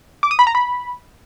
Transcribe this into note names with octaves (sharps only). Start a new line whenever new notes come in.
D6
D#6
B5
A#5
B5